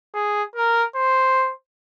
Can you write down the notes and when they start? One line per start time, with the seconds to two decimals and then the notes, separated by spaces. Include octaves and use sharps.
0.15 G#4
0.56 A#4
0.96 C5